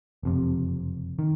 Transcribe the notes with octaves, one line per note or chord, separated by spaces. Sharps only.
F#1 F2 C3
D#3